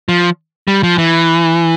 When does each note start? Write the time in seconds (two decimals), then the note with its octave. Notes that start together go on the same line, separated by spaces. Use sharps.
0.09 F3
0.68 G3
0.83 F3
0.98 E3